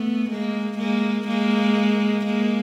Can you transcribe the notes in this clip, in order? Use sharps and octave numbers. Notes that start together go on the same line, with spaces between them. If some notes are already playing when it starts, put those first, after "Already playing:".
Already playing: A3 B3
G#3 A#3
G#3 A#3
G#3 A#3
G#3 A#3